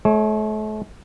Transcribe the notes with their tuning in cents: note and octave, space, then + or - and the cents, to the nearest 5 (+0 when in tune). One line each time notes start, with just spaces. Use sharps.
A3 -40 C#5 +0